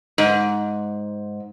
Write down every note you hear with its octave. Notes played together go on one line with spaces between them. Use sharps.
G#2